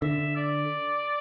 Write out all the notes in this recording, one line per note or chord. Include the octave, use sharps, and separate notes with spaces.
D3 E5
D5